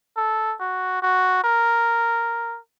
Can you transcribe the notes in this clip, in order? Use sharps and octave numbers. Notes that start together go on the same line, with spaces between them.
A4
F#4
F#4
A#4